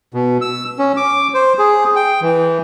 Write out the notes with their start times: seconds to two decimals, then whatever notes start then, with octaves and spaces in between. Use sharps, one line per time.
0.14 B2
0.41 E6
0.79 C#4
0.97 D6
1.34 C5
1.58 G#4
1.96 G5
2.22 E3